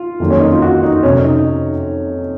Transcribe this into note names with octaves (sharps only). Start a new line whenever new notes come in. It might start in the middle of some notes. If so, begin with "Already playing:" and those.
Already playing: F4
F2 D#3 F#3 A#3
C#4
D#4
F4
F#4
D#4
F2 C3 F#3 C#4
D#4